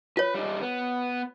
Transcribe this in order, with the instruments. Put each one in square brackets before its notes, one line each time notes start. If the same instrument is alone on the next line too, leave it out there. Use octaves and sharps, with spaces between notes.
[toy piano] F4 C#5 [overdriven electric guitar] B4
[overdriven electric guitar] G3 D#4
B3